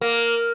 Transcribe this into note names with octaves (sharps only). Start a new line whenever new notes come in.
A#3